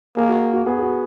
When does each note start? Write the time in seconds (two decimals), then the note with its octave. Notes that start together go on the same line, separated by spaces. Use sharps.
0.17 A#3 G#4
0.29 F#4
0.53 F#4
0.66 B3 G#4
0.78 G#4
0.83 F#4